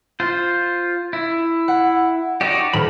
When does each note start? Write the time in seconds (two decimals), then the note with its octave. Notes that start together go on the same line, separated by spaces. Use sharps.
0.20 F4 C5
1.13 E4
1.68 F#5
2.41 D#4 F#4 G4 D5
2.74 D#1 A#4 B5 E7